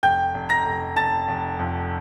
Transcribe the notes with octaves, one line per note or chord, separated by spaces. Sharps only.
F1 G5 G6
F1
A#5 A#6
F1
F1 A5 A6
F1
F2